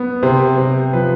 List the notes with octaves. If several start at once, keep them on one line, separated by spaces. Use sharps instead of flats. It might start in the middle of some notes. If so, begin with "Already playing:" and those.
Already playing: B3
C3 C5
C3
F3 B4